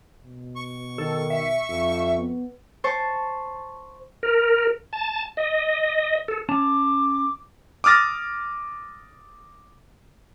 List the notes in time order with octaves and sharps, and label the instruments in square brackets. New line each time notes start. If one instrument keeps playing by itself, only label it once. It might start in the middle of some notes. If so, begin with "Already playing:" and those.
[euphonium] B2
[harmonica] C#6
[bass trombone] D#3 [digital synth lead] A4
[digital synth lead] E5
[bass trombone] F2
[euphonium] B3
[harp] C5 A5 C#6
[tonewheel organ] A#4
A5
D#5
A4
[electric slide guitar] C#4 A5 [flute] D6
[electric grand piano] D6 D#6 F6 A6 A#6